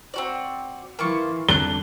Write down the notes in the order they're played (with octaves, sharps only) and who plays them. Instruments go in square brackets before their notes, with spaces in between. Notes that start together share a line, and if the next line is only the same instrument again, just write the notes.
[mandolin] C4 F#4 D5
[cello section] E3 [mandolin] A#3 F4 C#6
[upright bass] F2 D3 [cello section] G3 [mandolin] D4 F#6 [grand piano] G7